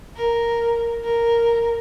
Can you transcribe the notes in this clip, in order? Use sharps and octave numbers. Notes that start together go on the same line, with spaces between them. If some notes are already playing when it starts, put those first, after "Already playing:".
A#4
A#4